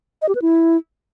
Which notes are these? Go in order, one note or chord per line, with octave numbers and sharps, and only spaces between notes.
D#5
G4
B4
E4